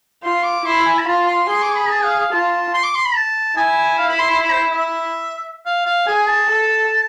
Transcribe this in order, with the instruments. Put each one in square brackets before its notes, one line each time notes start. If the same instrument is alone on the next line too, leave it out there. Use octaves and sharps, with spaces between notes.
[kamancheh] F4 [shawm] C6
[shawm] D6
[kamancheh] E4 [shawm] C6
[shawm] G#5
B5
[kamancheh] F4 [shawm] A5
[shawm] C6
[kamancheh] G#4 [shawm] C6
[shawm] D6
B5
A5
F5
F5
[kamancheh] F4 [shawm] A5
[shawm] C6
D6
C6
B5
A5
[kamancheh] E4 [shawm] G#5
[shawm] F5
B5
C6
C6
B5
C5
E5
F5
F5
[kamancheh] G#4 [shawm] G#5
[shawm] A5
[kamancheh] A4